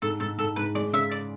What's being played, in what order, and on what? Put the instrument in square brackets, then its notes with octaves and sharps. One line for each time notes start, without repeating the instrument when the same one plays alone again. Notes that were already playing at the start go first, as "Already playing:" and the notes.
[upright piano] G#2 [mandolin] A4
[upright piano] G#2 [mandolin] A4
[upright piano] G#2 [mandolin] A4
[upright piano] G#2 [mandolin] B4
[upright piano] G#3 [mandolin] D5
[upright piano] C#3 [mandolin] E5
[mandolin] D5